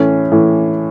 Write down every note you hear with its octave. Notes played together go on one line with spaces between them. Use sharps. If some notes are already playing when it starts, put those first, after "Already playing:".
Already playing: A2 E3 A3 C#4
A2 E3